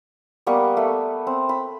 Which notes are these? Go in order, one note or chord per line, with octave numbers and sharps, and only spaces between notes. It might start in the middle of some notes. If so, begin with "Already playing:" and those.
G3 A#3 B3 C#6
A3
C4
B5